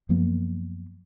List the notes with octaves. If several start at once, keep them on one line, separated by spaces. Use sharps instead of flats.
F#2 F3 A#3 B3